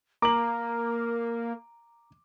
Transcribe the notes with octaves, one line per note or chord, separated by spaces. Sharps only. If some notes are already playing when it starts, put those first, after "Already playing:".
A#3 A#4 A#5 D6 F#7